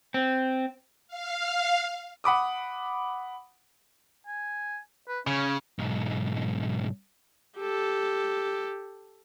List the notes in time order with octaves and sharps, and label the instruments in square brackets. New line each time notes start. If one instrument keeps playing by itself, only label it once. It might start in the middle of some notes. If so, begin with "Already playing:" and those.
[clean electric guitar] C4
[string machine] F5
[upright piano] F#5 B5 D6 D#6
[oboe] G#5
B4
[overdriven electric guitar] C#3 [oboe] C#4
[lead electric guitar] B1 G#2
[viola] G4 A4